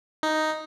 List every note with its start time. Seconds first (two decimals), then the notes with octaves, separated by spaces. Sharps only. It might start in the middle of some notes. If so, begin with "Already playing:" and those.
0.23 D#4